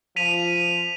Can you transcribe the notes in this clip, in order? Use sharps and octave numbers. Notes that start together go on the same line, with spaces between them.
F3 B6 D#7 F7